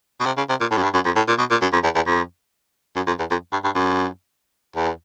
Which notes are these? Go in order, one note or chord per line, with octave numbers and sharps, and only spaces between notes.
B2
C3
C#3
C3
A#2
A2
F#2
G2
F#2
F2
A2
A#2
B2
A#2
F#2
F2
E2
E2
F2
F#2
F2
E2
F2
G2
G2
F#2
E2